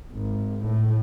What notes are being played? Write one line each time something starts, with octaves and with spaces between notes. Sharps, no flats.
G#1
A2